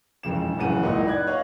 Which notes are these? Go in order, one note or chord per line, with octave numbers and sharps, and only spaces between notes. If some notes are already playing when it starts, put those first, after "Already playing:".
E1 F2 C#3 E7
D1 A1 F#2 C#3 F#5 D#7
C#2 A#2 D#4 E4 D#5 D#6
D5 B5 F#6 G#6
C#5 D#5 F5 F#5